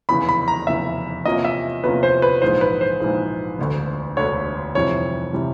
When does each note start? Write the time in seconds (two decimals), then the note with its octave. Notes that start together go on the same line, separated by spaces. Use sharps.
0.09 F1 E2 C#3 E3 B5
0.29 B5
0.48 A#5
0.67 F1 E2 C#3 E3 E5
1.25 E2 C3 F3 A#3 C#4 D#5
1.45 E5
1.84 E2 C3 F3 A#3 C#4 B4
2.03 C5
2.22 B4
2.42 A#1 G#2 E3 G#3 C5
2.61 B4
2.81 C5
3.00 A#1 G#2 E3 G#3
3.58 E1 D2 D3
4.17 E1 D2 D3 C#5
4.75 F1 F2 C3 E3 G3 C#5
5.33 C3 E3 G3